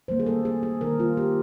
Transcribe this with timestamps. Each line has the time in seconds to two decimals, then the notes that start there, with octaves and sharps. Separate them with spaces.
0.08 D#3 G3 A#3 C5
0.20 G#4
0.26 A4
0.45 G#4
0.63 G#4
0.81 D#3 G3 A#3 A#4
1.00 F4
1.17 G4